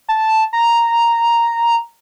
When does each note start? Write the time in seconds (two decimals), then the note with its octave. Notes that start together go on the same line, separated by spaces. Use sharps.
0.09 A5
0.53 A#5